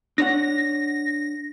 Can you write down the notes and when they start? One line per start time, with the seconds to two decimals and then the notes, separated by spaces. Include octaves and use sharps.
0.18 D4 C#5 F#5 A#6